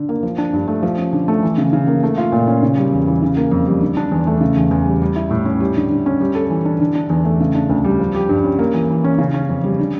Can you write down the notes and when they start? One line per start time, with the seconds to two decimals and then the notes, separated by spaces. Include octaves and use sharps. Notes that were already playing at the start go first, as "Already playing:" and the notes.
Already playing: D3
0.09 A#3
0.23 F3
0.38 D4
0.53 G2
0.68 A3
0.82 F3
0.98 C#4
1.13 D3
1.28 A3
1.43 E3
1.58 C#3
1.73 C#3
1.87 A#3
2.03 A3
2.18 F4
2.32 A#2
2.47 C#4
2.63 C#3
2.77 G3
2.93 E2
3.07 E3
3.23 C#3
3.36 A#3
3.52 F2
3.66 G3
3.81 D3
3.97 D4
4.11 E2
4.27 A3
4.41 C#3
4.56 E2
4.71 E2
4.86 G3
5.02 G3
5.16 E4
5.31 A2
5.45 C#4
5.60 G3
5.76 D3
5.91 D3
6.06 C#4
6.21 G3
6.35 A4
6.50 E3
6.65 D4
6.80 D3
6.95 D4
7.10 E2
7.25 A3
7.40 C#3
7.55 D4
7.69 D2
7.84 G3
7.99 F3
8.14 G4
8.29 G2
8.44 C#4
8.59 A#3
8.74 E3
8.90 E3
9.04 C#4
9.18 C#3
9.34 C#4
9.49 F2
9.64 G3
9.79 D3